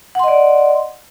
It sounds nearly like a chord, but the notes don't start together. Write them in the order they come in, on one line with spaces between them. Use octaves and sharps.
F#5 C6 D#5 D5